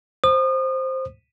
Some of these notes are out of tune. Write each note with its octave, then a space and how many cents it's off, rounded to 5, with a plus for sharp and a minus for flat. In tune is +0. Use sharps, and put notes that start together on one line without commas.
C5 +5 D#6 -35